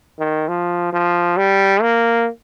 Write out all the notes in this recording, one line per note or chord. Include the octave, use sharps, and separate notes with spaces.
D#3
F3
F3
G3
A#3